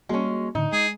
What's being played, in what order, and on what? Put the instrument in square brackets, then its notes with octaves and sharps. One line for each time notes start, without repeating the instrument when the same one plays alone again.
[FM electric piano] G3 A#3 F#4 [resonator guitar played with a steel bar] G#3 C#4
[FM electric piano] A2 D3 [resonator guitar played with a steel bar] D#4
[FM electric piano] G#3 [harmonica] G#4